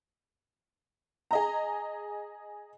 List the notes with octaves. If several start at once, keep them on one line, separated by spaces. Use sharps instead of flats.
G#4 D#5 A#5